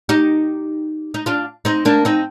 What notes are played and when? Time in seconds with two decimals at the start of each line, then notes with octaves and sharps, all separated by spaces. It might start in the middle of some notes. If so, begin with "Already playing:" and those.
0.09 D#4 G4
1.14 D#4
1.26 D4 F4
1.65 C4 D#4
1.85 A#3 D4
2.05 C4 D#4